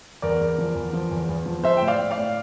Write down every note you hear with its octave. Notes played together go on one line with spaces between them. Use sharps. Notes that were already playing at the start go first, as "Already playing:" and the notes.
E2 A#4 D5
E2
F3
E2
F3
E2
E2
F3
F3 C5 E5
A2 G5
D5 F5
A2
D5 F5
A2